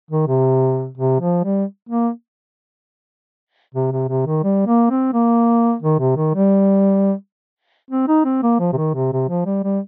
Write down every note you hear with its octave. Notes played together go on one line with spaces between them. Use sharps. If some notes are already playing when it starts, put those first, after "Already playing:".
D#3
C3
C3
F3
G3
A#3
C3
C3
C3
D#3
G3
A#3
C4
A#3
D#3
C3
D#3
G3
C4
D#4
C4
A#3
F3
C3
D#3
C3
C3
F3
G3
G3